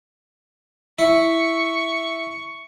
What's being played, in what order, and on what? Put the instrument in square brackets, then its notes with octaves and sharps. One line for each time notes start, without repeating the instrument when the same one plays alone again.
[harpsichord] E4 [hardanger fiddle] C#6